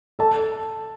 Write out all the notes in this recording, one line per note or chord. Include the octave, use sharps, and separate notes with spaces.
A4 A5